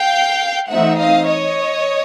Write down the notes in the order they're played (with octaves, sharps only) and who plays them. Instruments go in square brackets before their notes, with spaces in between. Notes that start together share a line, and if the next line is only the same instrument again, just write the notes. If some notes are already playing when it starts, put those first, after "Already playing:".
Already playing: [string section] F5 G5
E3 A3 C4 D#4 E5 F#5
D#5 F5
C#5 D#5